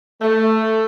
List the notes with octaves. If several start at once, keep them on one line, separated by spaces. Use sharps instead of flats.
A3